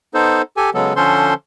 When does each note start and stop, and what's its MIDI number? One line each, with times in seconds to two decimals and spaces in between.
0.14 0.42 59
0.14 0.42 63
0.14 0.42 69
0.14 0.42 72
0.57 0.70 67
0.57 0.70 69
0.57 0.70 80
0.74 0.93 49
0.74 0.93 54
0.74 0.93 56
0.74 0.93 59
0.74 0.93 69
0.96 1.34 50
0.96 1.34 53
0.96 1.34 61
0.96 1.34 69
0.96 1.34 72
0.96 1.34 84